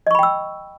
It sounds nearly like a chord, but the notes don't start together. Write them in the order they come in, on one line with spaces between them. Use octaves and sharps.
D#5 C#6 B5 G5 E6